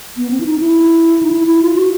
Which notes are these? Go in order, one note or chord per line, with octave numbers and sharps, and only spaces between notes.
B3
C4
E4
D#4
E4
D#4
E4
E4
F4
F#4